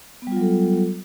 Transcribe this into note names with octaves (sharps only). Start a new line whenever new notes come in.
F#3 G3 B3 F4 A4